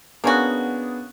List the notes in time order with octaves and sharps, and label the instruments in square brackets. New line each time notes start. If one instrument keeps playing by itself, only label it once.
[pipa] A#3 C#4 F#4 [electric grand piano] B3 D4 G#4